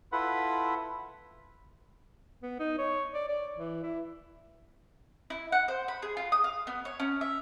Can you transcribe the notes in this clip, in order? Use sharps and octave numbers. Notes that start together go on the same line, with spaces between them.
E4 F4 A4 B4 F#5 B5
B3
D#4
C#5
D5
D5
E3
E4
E4
F#5
C5
B5
G#4
F4
D#6
F5
B3
C#5
C#4
E5